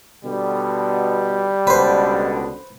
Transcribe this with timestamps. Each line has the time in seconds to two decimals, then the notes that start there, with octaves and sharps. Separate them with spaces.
0.25 B2 D3 G3
1.67 C#2 B2 D3 B4 C5